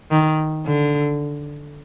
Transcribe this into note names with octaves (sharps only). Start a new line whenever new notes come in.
D#3
D3